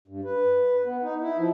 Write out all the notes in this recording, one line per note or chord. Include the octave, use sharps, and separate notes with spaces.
G2
B4
B3
D#4
E4
F3